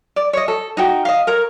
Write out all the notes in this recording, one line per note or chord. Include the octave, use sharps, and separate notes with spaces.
D5
C#5 D#5
A4
D#4 F#4 G5
D#5 F5
A#4 C#5 A#5